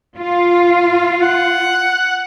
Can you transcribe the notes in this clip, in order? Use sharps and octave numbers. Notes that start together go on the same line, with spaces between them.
F4
F#5